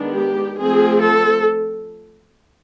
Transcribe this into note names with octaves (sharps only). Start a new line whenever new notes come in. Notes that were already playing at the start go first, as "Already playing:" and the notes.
Already playing: D#3 G#3 B3 D4
G4
F3 A3 C4 G#4
A4